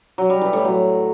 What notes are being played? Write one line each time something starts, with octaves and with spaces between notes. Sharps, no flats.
F#3
G3
E3
A2
F#3